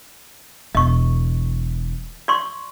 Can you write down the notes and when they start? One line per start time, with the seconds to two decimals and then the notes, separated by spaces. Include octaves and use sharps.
0.75 E1 D#5 C#6
2.28 D5 C6 C#6